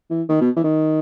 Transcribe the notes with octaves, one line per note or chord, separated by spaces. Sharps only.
E3
D#3
B2
E3
D#3